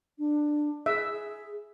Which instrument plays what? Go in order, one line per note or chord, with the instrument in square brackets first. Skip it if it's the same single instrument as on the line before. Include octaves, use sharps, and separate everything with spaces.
[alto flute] D4
[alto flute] G#4 [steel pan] E5